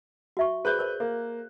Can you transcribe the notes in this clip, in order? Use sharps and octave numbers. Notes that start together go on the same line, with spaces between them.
F#4 E5 C#6
G#4 B4 C5 D5 F#6 G6
A#4 C5 D5
A#3